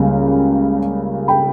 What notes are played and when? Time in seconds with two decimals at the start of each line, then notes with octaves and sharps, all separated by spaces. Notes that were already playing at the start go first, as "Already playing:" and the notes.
Already playing: C#2 C#3 G3 A#3
1.28 G5 B5